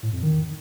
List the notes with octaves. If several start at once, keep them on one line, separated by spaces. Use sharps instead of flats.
A2
F2
D#3